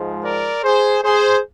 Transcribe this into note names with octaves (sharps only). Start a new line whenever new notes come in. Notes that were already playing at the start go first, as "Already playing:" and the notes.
Already playing: G#2 F3 G#3
A#4 D5
G#4 C5
G#4 C5